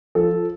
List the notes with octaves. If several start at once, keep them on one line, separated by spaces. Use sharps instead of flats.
F3 A4